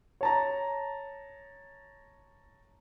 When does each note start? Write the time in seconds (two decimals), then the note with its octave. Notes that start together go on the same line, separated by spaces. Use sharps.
0.21 C#5 A5 A#5